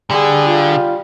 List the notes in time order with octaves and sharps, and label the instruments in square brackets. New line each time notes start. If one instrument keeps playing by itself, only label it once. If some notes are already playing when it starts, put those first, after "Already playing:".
[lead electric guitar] D3 [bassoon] G3 [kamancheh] G#4
[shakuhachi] F4